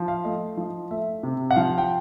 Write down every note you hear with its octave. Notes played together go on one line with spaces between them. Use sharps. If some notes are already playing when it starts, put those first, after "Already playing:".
Already playing: F3
F5
A3 D#5
F3
A3 E5
C3
F#5
F3 F5
G5